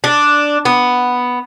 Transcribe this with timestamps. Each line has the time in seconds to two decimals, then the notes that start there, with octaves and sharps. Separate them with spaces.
0.04 D4
0.65 B3